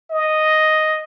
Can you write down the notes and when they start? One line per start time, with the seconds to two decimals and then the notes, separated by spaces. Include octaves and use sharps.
0.11 D#5